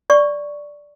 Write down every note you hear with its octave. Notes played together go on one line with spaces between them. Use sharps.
D5 C#6